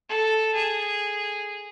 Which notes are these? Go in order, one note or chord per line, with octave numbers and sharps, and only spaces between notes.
A4
G#4